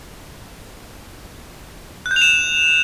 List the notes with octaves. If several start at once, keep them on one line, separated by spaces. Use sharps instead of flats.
F#6
G6
F7
E7